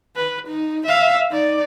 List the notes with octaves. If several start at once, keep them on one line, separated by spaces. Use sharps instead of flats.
B4
D#4
E5 F5
D#4 D5